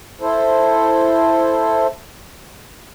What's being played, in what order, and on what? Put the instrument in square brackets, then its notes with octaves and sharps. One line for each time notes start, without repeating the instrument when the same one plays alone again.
[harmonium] E4 A4 C5